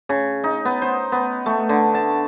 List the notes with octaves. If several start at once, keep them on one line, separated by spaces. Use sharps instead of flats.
C#3
D#4
B3
C5
B3
A3
D3
A5